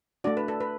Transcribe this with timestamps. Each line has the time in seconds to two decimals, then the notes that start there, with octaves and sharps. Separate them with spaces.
0.24 A3 D4 F#4 D5
0.37 B4
0.48 A4
0.61 B4